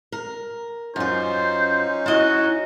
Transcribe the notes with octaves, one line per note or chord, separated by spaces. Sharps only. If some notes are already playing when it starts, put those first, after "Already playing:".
A#4
F#2 C#4 D#4 F4 C5
E4 F#4 D#5